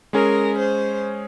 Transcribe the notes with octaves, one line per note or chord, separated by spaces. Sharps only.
G#3 C#4 G#4 A#4
C5